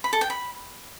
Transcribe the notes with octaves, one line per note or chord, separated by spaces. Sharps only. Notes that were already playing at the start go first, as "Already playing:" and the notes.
B5
A4
G5
B5